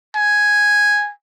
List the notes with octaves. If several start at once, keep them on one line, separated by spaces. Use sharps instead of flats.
G#5